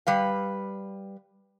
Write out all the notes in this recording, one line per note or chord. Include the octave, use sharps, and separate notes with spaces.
G3 B4 F5